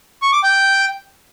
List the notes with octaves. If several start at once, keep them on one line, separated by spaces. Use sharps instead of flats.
C#6
D6
G5